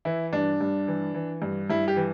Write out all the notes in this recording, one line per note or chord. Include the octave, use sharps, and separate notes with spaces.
E3 E4
G2 D4
G2
E3
E3
G2
G2 E4
G4
E3